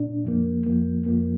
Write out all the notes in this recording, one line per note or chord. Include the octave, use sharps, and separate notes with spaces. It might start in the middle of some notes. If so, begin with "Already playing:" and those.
Already playing: A#2 D4
F2 F3 A#3
F2 F3 A#3
F2 F3 A#3